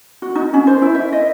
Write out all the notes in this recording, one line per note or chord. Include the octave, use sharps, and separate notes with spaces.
F#4
D#4
C#4
C5
E4
E5
D#5